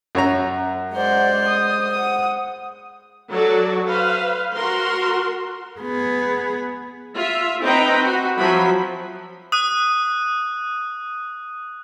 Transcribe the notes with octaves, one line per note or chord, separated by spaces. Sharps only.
F#2 C#5 A#5
G#3 C5 D5 F#5
D#6
F#5 D#6
F#3 F#4 A4 D5
B4 C5 F5
F#4 A#4 C6
B3 G#4
F4 E5
C4 D#4 B4 G5 A#5
F#4
F3 F#3 E5 B5
D#6 F#6 D#7